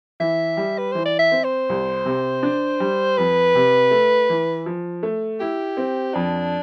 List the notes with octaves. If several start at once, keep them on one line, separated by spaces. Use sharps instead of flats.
E3 E5
G3
B4
E3 C5
D5
E5
C4
C5
C2
C3
D4
G3
F2 B4
C3
A3
E3
F3
A3
E4 G4
C4
F2 D4